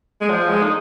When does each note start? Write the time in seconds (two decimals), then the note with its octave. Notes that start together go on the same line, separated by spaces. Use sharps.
0.21 G#3
0.30 F3
0.49 G#3
0.62 D#4